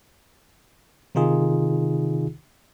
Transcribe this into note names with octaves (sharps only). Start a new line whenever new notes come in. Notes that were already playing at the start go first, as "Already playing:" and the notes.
C3 D#3 D#4 F4 G#4